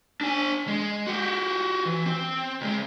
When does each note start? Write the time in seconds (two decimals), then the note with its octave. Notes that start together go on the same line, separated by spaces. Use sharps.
0.21 D4 G#5
0.67 G#3
1.07 F#4 G4
1.86 E3
2.06 C4
2.61 C#2 G#3